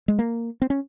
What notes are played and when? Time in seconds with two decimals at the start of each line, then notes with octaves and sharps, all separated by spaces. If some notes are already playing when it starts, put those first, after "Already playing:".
0.08 G#3
0.19 A#3
0.62 C4
0.70 C#4